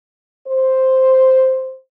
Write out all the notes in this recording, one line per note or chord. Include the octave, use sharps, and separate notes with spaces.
C5